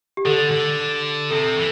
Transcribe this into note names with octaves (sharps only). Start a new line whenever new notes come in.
G4
D3 A4
D3
C3 A4
E3